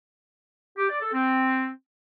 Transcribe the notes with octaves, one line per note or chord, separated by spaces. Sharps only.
G4
D5
A4
C4